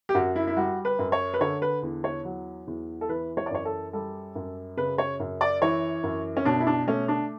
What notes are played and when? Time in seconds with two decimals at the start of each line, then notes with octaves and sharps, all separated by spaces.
0.09 G4
0.15 F#2 F#4
0.36 E4
0.47 E4
0.57 G3 F#4
0.85 B4
0.99 F#2
1.12 C#5
1.34 B4
1.40 D3 C#5
1.62 B4
1.83 E2
2.04 C#5
2.25 F#3
2.67 E2
3.01 A4
3.09 E3 B4
3.37 C#5
3.46 D5
3.51 F#2 C#5
3.65 A4
3.93 G3 A4
4.35 F#2
4.77 C#3 B4
4.98 C#5
5.20 F#2
5.41 D5
5.62 E3 C#5
6.04 F#2
6.37 C#4
6.45 B2 D4
6.60 E4
6.67 D4
6.88 A3 C#4
7.08 D4